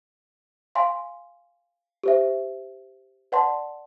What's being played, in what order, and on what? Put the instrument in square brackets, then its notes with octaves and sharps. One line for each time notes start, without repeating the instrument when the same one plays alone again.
[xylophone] F5 G#5 C6
G4 C5 E5
B4 D5 F#5 A5 C6